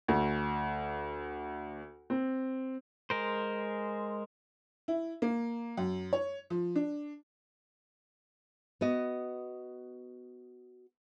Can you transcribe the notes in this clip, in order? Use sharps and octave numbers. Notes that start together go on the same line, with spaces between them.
D2
C4
G#3 A#4 C5
E4
A#3
F#2
C#5
F3
D4
B3 F#4 D#5